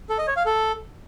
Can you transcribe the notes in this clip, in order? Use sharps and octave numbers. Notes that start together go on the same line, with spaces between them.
A4
D#5
C#5
F5
A4